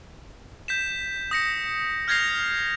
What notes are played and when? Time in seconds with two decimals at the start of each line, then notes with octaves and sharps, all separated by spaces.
0.68 G6 B6 E7
1.31 D#6 A#6 C#7
2.08 F6 G6 G#6 A#6 C7 F7